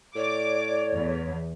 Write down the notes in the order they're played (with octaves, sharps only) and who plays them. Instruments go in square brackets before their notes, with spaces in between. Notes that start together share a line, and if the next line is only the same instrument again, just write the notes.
[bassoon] A2 [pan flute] C#5 [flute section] D5 [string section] D6
[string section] E2